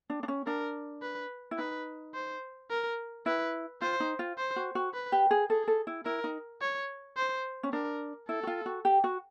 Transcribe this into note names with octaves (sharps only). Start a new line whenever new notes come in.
D4
D4
C#4
D4 A#4
B4
E4
D#4 B4
C5
A#4
E4 B4
F4 C5
D#4
F4
C5
F#4
F#4
B4
G4
G#4
G#4 A4
A4
E4
E4 A#4
D#4
C#5
C5
C#4
D4 A#4
E4 A4
F#4
F4
F#4
G4
F#4